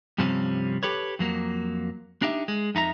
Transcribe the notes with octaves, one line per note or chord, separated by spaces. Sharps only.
G2 C3 F3 G3 C4 C#4
G4 A4 B4 C#5
F2 F#3 A#3
D4 D#4 G4 E5
G#3
F2 D#4 E5 A#5